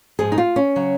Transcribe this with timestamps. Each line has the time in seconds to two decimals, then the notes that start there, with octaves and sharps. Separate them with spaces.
0.19 G#2 F3 G#4
0.32 D#4
0.38 F4
0.56 C#4
0.76 C#3 F#3